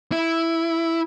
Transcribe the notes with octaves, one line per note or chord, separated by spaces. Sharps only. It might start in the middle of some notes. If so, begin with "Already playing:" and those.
E4